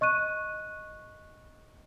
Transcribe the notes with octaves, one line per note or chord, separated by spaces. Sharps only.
D#5 C#6 F#6 D#7